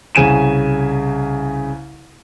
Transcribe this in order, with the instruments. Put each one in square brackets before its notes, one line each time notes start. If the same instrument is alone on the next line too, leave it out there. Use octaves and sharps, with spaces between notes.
[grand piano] C2 C#3 G#5 D#7 E7